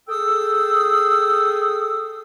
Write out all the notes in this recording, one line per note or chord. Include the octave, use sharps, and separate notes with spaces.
G#4 A4 G5 D#6 E6